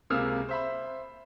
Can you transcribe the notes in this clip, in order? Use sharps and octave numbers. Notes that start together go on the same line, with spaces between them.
C#2 C3 G#3 A#3 E6 F6
C5 E5 B5